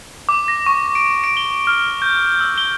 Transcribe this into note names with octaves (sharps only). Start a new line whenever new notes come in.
D6
A#6
C#6
D7
D7
G7
F6
G6
E6
G7